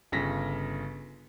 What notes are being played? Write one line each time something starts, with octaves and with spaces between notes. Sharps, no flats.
G1 C#3 A#6 B6